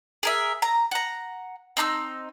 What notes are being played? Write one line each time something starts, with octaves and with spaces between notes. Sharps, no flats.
G#4 A#4 E5
A#5
F#5 A#5
C4 D#4 A#5 E6